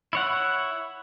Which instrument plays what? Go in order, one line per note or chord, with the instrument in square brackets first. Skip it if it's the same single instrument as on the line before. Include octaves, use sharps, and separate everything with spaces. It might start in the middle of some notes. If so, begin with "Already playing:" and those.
[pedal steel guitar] E4 C#5 F#5